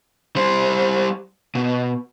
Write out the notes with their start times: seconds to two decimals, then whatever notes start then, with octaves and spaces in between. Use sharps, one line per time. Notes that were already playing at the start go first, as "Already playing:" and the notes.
0.36 G3 C5
1.55 B2